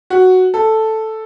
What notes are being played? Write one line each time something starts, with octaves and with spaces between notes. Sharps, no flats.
F#4
A4